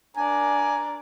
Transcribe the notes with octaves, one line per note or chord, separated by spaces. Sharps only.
D4 A#4 D5 G#5 A#5